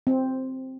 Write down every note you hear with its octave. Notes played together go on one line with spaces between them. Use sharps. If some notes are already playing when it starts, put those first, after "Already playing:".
C4